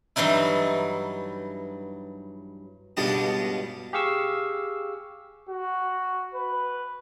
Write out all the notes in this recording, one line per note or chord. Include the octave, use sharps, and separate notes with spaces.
G2 E3 F#3 D#4 E4
C#2 G2 B2 G3 D4 D#5
G4 G#4 F5 C#6 E6
F#4
B4